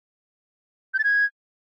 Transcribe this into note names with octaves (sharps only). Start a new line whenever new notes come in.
G6
A6
G#6